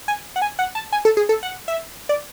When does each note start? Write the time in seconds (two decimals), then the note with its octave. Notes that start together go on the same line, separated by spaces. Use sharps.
0.08 G#5
0.36 F#5
0.42 G#5
0.59 F#5
0.75 A5
0.93 G#5
1.05 A4
1.17 G#4
1.29 A4
1.43 F#5
1.68 E5
2.09 D5